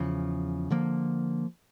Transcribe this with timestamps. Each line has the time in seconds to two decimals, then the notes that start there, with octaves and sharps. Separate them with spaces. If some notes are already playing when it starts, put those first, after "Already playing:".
Already playing: E2 C#3 F3
0.70 D3 F3 A#3